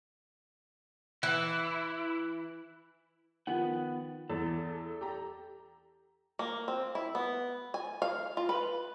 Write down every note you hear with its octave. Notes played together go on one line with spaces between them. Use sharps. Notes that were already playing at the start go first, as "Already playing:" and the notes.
E3 E4
D#3 F3 B3 F#5
E2 A4
G4 A#5
A#3
C4
E4
B3
G#5
F5
F4
B4